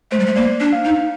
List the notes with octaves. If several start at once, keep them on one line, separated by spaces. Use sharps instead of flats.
A3 C5
G3
A3
A#3 D5
D4
F5
D#4